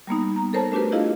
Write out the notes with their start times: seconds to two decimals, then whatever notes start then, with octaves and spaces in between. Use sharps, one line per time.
0.07 G3 A#3 B3 D#4
0.36 A#5
0.53 A4 A#4 C5 C#5 A5
0.72 A3 D4 F#4 G4 B4
0.92 E4 F4 G#4 D#5 F5